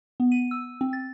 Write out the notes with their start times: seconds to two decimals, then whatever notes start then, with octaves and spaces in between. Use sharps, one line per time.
0.20 B3
0.32 D#7
0.51 E6
0.81 C4
0.93 A6